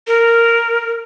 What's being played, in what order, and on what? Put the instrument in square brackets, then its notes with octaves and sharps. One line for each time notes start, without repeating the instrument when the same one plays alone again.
[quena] A#4